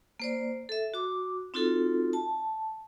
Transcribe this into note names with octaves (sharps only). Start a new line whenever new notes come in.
A#3 C5 D5
A4 E5
F#4 D6
C4 D#4 F4 F#4 A4
A5